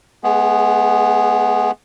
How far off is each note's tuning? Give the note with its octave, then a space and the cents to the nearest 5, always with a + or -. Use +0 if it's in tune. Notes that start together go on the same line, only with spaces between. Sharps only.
G#3 +40 B3 +0 G#4 -10